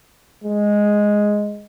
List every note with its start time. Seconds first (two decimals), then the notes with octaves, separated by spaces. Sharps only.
0.44 G#3